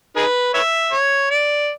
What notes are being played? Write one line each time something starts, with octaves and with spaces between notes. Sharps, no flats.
D#4 G#4 B4
B4 C#5 E5
C#5
D5